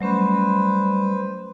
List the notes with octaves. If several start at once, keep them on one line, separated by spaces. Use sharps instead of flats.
F#3 G3 A3 C#4 B4 C5